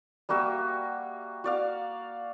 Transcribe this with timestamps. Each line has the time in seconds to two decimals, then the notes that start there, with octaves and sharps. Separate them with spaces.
0.29 G3 A#3 F#4 E5
1.44 F#4 D5 F5